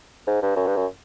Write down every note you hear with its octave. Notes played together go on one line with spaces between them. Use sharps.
G#2
G2
F#2
G2
F#2